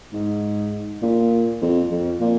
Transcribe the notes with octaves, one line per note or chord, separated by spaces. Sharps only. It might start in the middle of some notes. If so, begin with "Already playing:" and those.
G#2
A#2
F2
F2
A#2